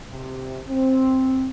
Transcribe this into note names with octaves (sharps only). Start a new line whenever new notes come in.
C3
C4